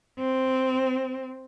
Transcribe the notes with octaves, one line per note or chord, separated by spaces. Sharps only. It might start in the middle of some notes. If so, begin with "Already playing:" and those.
C4